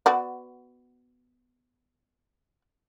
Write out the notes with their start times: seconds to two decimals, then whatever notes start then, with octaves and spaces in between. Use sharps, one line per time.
0.06 B3 F#4 D5